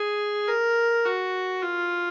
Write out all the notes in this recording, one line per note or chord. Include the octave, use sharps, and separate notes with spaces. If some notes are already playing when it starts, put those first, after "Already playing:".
Already playing: G#4
A#4
F#4
F4